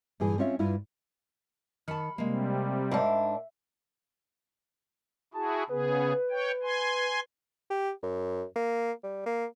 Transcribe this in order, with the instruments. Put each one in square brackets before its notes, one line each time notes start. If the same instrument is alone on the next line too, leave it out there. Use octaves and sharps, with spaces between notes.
[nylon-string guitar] G2 A#2 E3 G#4
C4 C#4 F4 C#5 D#5 E5
G2 E4 F4 B4
[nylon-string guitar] D#3 A5 [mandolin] B5 C#6 F6
[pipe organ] C3 G3 [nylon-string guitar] G#3 A#3
[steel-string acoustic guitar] G#2 D4 [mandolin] E4 [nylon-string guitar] A#4 F5 F#5
[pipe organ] E4 F#4 G#4 [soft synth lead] A5
[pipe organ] C#3 B3 G#4 [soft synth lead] B4
[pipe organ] C#5 G5
G#5 C6
[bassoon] G4
F#2
A#3
G3
A#3